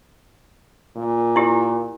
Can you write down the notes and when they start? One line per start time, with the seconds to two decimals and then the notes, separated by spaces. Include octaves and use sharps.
0.96 A#2
1.36 E4 G4